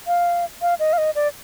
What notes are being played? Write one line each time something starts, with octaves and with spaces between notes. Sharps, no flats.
F5
F5
D#5
F5
D#5
D5